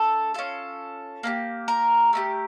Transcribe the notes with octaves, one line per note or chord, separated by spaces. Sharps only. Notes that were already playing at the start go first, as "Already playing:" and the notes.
Already playing: A3 D4 A4
C#4 F4 A4
A#3 D4 G4
A#4
A3 E4 G4